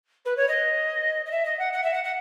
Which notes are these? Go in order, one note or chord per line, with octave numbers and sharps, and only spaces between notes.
B4
C#5
D#5
D#5
E5
D#5
F#5
F#5
E5
F#5
F#5